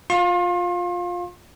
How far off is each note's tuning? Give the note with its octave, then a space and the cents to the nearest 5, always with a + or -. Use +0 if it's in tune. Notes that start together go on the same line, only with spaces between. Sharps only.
F4 +15 C6 +40